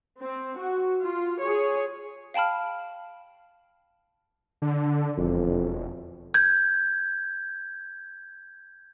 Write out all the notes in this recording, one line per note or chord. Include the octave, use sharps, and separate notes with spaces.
C4
F#4
F4
G#4 C#5
F5 G5 A5 B5 F6
D3
E1 F2
G6 G#6